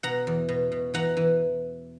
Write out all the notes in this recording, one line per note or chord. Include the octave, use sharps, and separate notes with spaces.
B2 F#5 A#5
E2
B2
B2
E3 F#5 A#5
E3